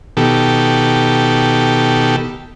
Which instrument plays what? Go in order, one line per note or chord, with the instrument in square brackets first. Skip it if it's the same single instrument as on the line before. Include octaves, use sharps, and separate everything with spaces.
[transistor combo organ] B2 D#3 G4 A4